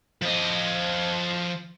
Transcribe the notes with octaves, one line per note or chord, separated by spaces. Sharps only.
F3 D#5